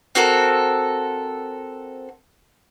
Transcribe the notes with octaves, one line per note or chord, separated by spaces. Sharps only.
C4 F#4 A4 A#4